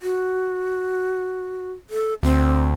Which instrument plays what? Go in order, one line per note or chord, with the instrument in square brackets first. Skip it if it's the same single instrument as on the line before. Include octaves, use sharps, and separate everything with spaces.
[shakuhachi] F#4
A4
[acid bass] D2 [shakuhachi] C4